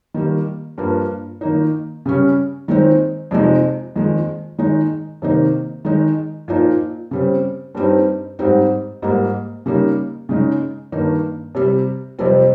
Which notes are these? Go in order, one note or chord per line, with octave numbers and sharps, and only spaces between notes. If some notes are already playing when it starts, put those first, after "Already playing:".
D#3 G3 A#3
G2 F3 A#3
D#3 A#3 D#4
C#3 G3 C#4
D#3 G#3 C4 D#4
F2 C3 F3 G#3 D#4
F2 D#3 G#3
D#3 G#3 D#4
C3 D#3 A#3 D#4
D#3 G#3 D#4
A#2 F3 A#3 D#4
C#3 G3 C4
G2 G3 C4 D#4
G#2 G3 C4 D#4
G#2 G3 A#3
C#3 G3 A#3 D#4
C#3 G#3 D#4
G2 D#3 A#3 D#4
C3 G3 C4
F2 C3 G3 C4